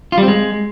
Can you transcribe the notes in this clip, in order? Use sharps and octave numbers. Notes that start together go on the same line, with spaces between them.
F4
G3
C4
G#3